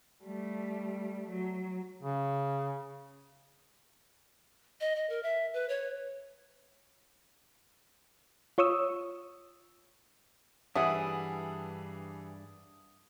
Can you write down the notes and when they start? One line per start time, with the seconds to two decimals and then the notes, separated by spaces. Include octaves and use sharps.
0.23 G3 A3
1.30 F#3
2.01 C#3
4.81 D#5
4.96 D#5
5.10 A#4
5.23 E5
5.54 B4
5.69 C#5
8.58 F4 C#5 C#6 D#6 E6
10.75 G2 E3 G3 D4 G#4 E5 F#5 D#6